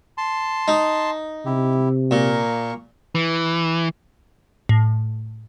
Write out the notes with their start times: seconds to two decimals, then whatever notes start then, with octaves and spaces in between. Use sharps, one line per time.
0.18 A5 C6
0.68 D#4
1.46 C3 E4 G4
2.11 A#2 A#3 A#4 C#6
3.15 E3
4.69 A2